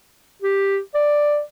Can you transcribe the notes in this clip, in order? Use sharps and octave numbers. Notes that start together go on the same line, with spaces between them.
G4
D5